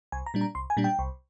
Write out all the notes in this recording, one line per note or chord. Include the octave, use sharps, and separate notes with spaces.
C2 G#5
A#5
A#2 G3 D4
A#5
C2 C6
G#5
A#2 G3 D4
G5
C2